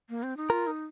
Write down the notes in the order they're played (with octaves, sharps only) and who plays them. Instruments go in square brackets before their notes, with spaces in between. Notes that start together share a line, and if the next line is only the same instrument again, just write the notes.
[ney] A#3
C4
D#4
[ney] F4 [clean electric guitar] A#4
[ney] D#4